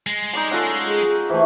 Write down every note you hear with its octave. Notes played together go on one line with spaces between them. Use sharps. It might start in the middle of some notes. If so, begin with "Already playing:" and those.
G#3
D#4 D5 A5
C#4 F4 A4 F#5
G#4
E3 A3 C5